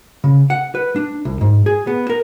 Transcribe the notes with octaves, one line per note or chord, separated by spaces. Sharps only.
C#3
F#5
B4
D4
C2
G#2
G#4
B3
A#4